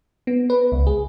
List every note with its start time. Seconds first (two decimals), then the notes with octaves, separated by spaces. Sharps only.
0.27 B3
0.50 B4
0.72 C#2
0.87 G#4